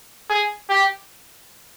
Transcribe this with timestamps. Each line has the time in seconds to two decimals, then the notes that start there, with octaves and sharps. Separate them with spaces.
0.30 G#4
0.70 G4